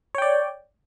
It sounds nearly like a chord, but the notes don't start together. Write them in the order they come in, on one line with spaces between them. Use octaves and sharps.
C#5 G5 D5